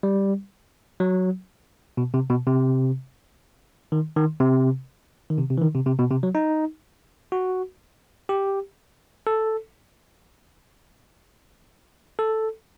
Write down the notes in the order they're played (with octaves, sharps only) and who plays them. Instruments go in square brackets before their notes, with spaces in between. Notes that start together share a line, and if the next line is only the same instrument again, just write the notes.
[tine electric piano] G3
F#3
B2
C3
B2
C3
D#3
D#3
C3
D#3
C3
C3
E3
D#3
C3
C3
B2
C3
F#3
D#4
F#4
G4
A4
A4